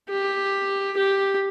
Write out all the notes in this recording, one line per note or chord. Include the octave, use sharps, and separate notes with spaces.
G4
G4